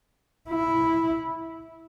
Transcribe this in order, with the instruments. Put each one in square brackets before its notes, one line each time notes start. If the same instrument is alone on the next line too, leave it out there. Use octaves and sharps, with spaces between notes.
[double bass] E4